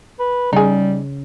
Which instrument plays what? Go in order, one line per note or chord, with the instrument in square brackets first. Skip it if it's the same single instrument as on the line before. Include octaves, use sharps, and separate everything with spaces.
[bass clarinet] B4
[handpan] C#3 [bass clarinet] G3 [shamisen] D#4 G#4